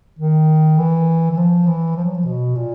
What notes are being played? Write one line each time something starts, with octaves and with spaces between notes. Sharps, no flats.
D#3
E3
E3
F3
E3
F3
F#3
F3
B2
A#2